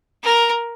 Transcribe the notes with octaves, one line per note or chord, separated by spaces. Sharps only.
A#4